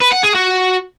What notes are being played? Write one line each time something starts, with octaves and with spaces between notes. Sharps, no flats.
B4
F#5
G#4
F#4